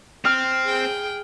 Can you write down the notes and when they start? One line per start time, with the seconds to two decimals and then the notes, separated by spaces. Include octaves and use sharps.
0.25 C4 F6
0.65 G#4 G5